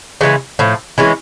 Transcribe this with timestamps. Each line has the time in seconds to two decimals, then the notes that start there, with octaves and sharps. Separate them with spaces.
0.21 C#3 E3 G#3 C#4
0.59 A2 F3
0.98 E3 G#3 C#4